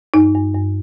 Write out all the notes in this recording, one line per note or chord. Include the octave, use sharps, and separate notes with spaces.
G2 D#4
G2
G2